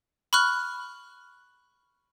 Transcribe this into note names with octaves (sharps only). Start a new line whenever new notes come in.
B5 C#6 F6 F#6